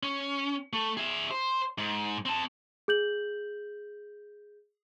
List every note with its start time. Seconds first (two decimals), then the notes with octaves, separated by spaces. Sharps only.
0.03 C#4
0.73 A3
0.97 G#4 E5
1.31 C5
1.78 G#2
2.26 C4 A5
2.88 G#4 G6 F#7